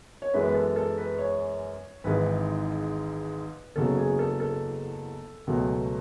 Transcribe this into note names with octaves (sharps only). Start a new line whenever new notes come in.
C#5
F#2 E3 G#3 B3 B4
B4
A4
A4
B4
C#5
G#1 G#2 E3 B4
F#1 E2 C#3 F#3 A4
G#4
A4
A4
C#2 B2 F#3 A3